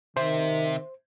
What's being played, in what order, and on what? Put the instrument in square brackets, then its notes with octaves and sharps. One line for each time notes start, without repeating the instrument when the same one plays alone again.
[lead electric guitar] C3 E5 [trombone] D#3 [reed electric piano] C5